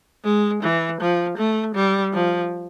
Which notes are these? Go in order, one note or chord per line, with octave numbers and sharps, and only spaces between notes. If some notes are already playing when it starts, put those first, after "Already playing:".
G#3
E3
F3
A3
G3
F3